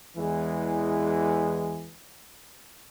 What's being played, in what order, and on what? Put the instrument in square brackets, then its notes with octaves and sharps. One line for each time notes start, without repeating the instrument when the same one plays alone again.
[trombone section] E2 E3 G#3